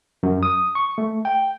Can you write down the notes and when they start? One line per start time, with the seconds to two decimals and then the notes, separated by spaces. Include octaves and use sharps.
0.23 F#2
0.43 D#6
0.75 C#6
0.98 A3
1.25 G5